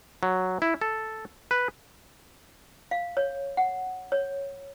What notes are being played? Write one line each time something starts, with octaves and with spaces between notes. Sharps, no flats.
F#3
E4
A4
B4
F5
C#5
F#5
C#5